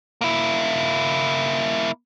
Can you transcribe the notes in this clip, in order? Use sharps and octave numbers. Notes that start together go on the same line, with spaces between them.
A#3 E4